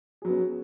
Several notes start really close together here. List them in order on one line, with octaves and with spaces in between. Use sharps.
G#4 F#3 B3 C#4